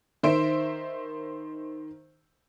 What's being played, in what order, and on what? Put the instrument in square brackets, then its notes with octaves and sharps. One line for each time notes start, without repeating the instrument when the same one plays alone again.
[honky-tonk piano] D#3 C5 E5 D7